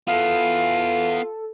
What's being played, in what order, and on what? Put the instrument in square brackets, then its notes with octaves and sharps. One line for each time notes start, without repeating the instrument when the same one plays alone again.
[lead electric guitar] B3 E4 [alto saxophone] F4 [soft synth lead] A4 [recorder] F5